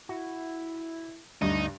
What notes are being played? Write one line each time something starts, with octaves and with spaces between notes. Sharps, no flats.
E4 F#4
D2 G2 D#4